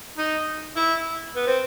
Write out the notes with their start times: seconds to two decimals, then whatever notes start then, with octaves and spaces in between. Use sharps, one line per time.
0.18 D#4
0.76 E4
1.36 B3
1.47 C4